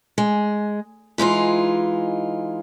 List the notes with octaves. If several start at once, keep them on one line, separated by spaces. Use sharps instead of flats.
G#3
E3 G#3 D#4 F4